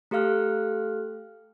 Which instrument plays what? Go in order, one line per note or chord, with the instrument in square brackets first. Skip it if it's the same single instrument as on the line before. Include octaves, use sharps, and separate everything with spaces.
[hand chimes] A3 G4 A4 F5 F6 F#6